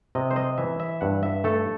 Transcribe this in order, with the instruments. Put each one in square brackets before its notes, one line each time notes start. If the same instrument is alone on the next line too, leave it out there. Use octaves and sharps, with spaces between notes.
[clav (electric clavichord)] C3 D#5
C5
D#5
E3 E5
E5
G2 F#5
E5
A3 A4